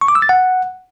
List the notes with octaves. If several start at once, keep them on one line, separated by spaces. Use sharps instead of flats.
C#6
D6
E6
A6
F#5